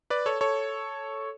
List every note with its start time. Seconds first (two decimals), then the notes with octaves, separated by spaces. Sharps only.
0.10 B4 D5
0.26 A4 C#5
0.41 A4 C#5